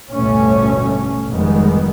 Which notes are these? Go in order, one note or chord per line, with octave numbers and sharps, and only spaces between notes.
A1 D2 G2 B2 A3 C#4
F1 G#2 D#3 G3 G#3 B3